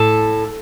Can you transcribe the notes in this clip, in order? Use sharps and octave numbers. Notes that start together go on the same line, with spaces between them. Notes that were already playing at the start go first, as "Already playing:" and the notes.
Already playing: A2 A4